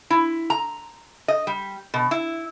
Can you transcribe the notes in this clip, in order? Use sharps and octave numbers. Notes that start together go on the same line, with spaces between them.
E4
A#5
D#5
G3
B2
E4